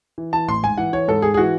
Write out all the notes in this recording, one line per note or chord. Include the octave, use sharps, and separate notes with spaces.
E3
E3 A5
A1 C6
G#2 G#5
E3 F#5
E3 C#5
G#2 A4
G#2 G#4
G#4
E3 F#4